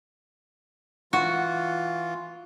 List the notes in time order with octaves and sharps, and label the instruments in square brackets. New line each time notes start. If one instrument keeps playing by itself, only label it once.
[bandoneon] E3 F4 [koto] F#4